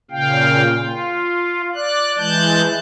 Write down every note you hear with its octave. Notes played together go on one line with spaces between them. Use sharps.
A#2 C#3 F5 G5
F4
D5 F#6
E3 G#3 A5 F#6 G6